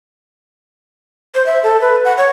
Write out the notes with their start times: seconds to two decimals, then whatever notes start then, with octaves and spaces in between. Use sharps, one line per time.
1.35 C5
1.46 E5
1.63 A4
1.81 B4
2.05 F#5
2.18 C#5